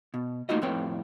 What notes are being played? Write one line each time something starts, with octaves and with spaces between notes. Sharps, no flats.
B2
A3 A#3 D#4 F4 F#4 D#5
F2 A2 C4 B4 C#5 G5